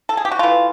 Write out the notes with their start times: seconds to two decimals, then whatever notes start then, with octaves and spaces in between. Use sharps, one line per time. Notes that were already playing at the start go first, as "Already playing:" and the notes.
0.09 A4
0.17 G#4
0.25 G4
0.32 F#4
0.39 E3 A3 F4